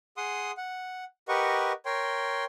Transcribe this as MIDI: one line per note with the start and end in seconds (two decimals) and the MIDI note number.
0.17 0.51 68
0.17 0.51 78
0.17 0.51 84
0.17 0.51 87
0.57 1.04 78
1.28 1.72 67
1.28 1.72 70
1.28 1.72 71
1.28 1.72 75
1.28 1.72 78
1.28 1.72 85
1.86 2.45 70
1.86 2.45 73
1.86 2.45 79
1.86 2.45 84